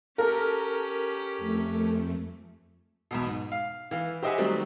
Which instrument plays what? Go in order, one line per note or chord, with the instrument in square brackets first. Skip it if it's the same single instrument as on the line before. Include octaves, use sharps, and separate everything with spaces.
[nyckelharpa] C#4 G4 [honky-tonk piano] A4 A#4
[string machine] F2 A3
[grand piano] B1 E2 B2
G#2
F5
E3 F5
G4 C5 D#5 E5 F#5 G#5
D#3 F#3 G3 A3 C4 D#4